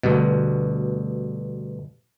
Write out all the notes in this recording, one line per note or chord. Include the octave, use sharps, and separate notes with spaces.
D2 G2 B2